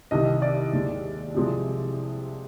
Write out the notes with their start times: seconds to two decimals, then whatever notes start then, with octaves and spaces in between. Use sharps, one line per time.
0.11 C2 C3 D#3 D#5
0.42 D5
0.73 D#2 D#3 G#3
1.34 C2 C3 F3 G#3